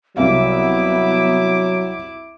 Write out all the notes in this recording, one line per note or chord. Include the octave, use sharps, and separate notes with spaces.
C2 F#3 B3 E4 E5 F5 D6